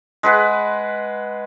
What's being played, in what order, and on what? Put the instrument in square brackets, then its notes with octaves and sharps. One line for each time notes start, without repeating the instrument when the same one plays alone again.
[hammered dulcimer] G#3 B4 F#5